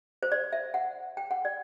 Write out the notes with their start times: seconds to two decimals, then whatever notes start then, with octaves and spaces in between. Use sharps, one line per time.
0.23 C5
0.32 D5
0.53 E5
0.74 F#5
1.17 G5
1.31 F#5
1.45 D5